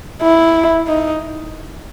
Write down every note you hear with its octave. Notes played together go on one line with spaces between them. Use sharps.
E4
D#4